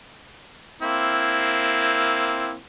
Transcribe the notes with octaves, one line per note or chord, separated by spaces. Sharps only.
A#3 C4 E4